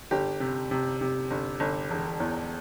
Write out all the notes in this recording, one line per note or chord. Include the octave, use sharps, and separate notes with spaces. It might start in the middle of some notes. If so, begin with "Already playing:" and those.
G1 G4
C3
C3
C3
G1
G1
E1
E2